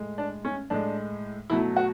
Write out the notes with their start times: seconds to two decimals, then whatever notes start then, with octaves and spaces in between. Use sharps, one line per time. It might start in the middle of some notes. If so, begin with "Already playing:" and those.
Already playing: A2 G#3
0.18 D4
0.45 C#4
0.70 A2 G#3 D4
1.50 B2 F#3 A3 E4
1.76 F#4